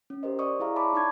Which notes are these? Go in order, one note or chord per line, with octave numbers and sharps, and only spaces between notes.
C#4
G4 A#4 C5 D#5
D5 D#5 C#6 D#6
E4 G#4 E5 F5 A#5
C#5 D5 A5 B5 C#6 D6
D4 D#4 A5 C#6 G#6